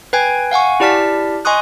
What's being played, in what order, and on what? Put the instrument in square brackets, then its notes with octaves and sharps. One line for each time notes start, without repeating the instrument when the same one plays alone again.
[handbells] B4 G5 G#5 G#6
F5 F#5 G#5 C#6
E4 G4 D5 A5 F6 B6
D#5 G#5 C6 C#6 D#6 F#6